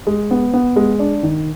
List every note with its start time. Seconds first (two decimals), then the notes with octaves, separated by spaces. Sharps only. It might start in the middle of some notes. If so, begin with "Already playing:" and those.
0.07 G#3
0.31 B3
0.54 B3
0.76 G#3
0.99 D4
1.23 D#3